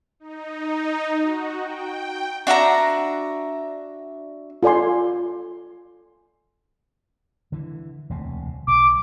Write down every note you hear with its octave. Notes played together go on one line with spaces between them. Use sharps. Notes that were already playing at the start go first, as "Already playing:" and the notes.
D#4
F#4
G5
D4 F#4 E5 A#5
F4 A4 D5 G#5 C6
D3 E3
E1 D2 C3
B1 D6